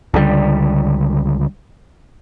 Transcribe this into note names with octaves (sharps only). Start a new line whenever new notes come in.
C#2 D3 F#3 G3